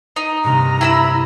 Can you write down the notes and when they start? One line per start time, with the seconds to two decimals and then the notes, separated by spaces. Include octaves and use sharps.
0.16 D#4
0.44 G2 C3 A#3 A#5
0.81 E4 B5 E6 D#7